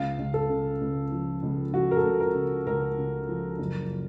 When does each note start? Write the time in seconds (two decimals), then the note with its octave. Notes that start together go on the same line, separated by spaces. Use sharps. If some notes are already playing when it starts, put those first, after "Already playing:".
Already playing: C#2 F5
0.19 C#2
0.34 A4
0.50 C#3
0.81 C#2
1.12 F3
1.43 C#2
1.73 F3 F#4
1.91 A#4
1.97 A4
2.04 C#2
2.20 A#4
2.35 C#3
2.66 C#2 A#4
2.98 C#3
3.29 F3
3.58 F#1